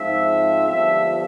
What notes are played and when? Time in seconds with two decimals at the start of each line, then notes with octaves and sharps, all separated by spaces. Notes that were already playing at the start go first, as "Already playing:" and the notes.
Already playing: G#2 F3 C4 E5
0.66 G1 G2 F3 E5